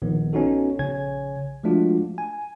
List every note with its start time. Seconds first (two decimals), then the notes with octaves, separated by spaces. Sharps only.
0.02 A#1 D#3 B3
0.33 B3 C#4 D#4 F#4 A4
0.79 A#1 C#3 C#5 G#5 G#6
1.64 F3 G#3 A3 D4 F4 F#4
2.18 G#5